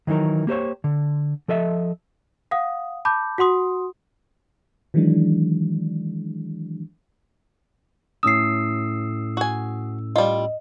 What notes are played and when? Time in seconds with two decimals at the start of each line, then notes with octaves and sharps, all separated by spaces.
0.07 D#3 E3 F#3 D#4 A#4
0.47 A#3 G4 C5 C#5
0.84 D3
1.48 F3 A4 D#5 E5
2.51 F5 F#5 D#6
3.05 A5 B5 D6 G6
3.38 F#4 F#5 C6 D#6
4.94 D#3 E3 F#3 G#3 D4
8.23 A2 C#4 D#6 E6 C7
9.37 F#4 G#5
10.16 G3 F4 D#5